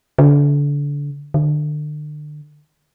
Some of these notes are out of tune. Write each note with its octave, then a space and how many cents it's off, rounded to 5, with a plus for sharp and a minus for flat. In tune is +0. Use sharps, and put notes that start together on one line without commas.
D3 -30
D3 +35